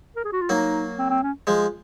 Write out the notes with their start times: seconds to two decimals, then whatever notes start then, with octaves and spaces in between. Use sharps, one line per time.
0.16 A#4
0.25 G#4
0.32 F#4
0.41 F4
0.49 F#3 A#3 D#4
0.99 C4
1.10 C4
1.23 C#4
1.47 F3 G#3